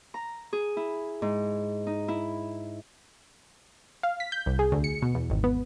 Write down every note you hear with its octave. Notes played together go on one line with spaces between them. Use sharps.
A#5
G#4
E4
G#2
D#4
E4
F5
B6
G6
C2
G#4
D2
C#7
B2
E2
G#1
B3